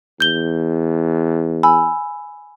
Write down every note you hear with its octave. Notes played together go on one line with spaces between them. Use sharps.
E2 G6 G7
G#5 B5 E6